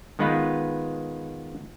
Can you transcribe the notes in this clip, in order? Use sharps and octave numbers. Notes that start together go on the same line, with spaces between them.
D#3 G#3 B3 D#4 F4 B4